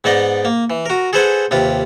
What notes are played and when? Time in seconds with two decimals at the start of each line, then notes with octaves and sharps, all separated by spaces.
0.04 G#2 B3 D#4 D5 D#5
0.45 A#3
0.70 E3
0.86 F#4 A#4
1.13 G#4 A4 B4 C5 F#5 G#5
1.51 D#2 C3 F4 B4